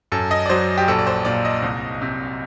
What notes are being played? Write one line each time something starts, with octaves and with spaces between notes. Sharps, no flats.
F#2 A4
D#5
D5
F#3 C5
G4
A#1 A4
D5
C5
A#2 D5
D#5
C2
C3